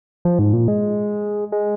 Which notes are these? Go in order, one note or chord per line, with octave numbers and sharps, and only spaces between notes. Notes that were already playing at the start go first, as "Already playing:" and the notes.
F3
G#2
A#2
G#3
G#3